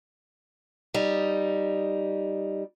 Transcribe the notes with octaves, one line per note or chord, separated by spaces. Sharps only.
G3 D#4